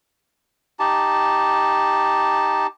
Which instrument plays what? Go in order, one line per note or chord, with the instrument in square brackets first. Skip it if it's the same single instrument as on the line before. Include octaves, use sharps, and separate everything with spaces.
[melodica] D#4 G4 A5